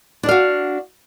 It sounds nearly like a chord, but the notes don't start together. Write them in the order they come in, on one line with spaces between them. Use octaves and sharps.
D4 D5 F5 F#4